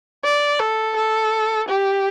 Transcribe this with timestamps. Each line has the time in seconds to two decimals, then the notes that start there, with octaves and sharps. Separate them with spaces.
0.24 D5
0.59 A4
0.96 A4
1.69 G4